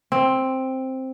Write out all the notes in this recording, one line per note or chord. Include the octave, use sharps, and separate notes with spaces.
C4